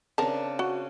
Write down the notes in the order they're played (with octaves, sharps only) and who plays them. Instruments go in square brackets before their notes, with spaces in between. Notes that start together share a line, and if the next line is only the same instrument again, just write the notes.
[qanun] C#3 C4 D4 [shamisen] A#4 A5
[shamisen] F#4